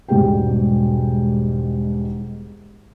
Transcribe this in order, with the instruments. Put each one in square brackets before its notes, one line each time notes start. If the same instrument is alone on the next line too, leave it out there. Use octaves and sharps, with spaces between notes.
[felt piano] E1 G#2 B2 G3 G#4 G5